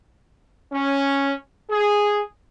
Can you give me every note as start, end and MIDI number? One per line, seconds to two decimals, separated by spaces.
0.73 1.32 61
1.70 2.21 68